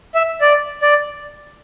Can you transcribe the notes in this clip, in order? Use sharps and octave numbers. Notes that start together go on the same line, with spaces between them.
E5
D5
D5